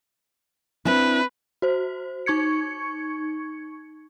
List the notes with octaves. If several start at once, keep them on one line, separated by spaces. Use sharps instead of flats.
C4 D4 E4 B4
F#4 C5
D#4 C#6 G#6 C#7